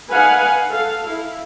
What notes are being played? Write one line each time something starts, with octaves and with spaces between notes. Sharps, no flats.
D#4 B4 F5 F#5 G#5
A4 F5
E4